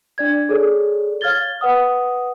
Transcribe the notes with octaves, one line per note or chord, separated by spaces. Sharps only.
D4 D5 G#6
G#4 A4 C#5 D5
C#5 F5 F6 G#6 A6 G7
B4 F#5 D#6